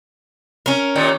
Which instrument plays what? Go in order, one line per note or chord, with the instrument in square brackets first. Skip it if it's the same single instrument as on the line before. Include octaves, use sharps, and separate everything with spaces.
[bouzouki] C#4 A#4
[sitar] D#2 A#2 D#3